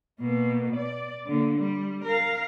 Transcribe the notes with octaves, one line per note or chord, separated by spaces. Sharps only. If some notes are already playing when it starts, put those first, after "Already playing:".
B2 A#3
D5
D3 A#3
G3
A#4 F5